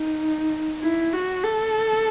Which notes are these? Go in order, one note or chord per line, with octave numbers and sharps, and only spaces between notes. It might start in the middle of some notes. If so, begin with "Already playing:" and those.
Already playing: D#4
E4
F#4
A4